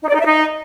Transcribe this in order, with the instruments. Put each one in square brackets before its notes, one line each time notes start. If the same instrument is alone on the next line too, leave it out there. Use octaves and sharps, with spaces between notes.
[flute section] D#4
D5
D#4
E5
D#4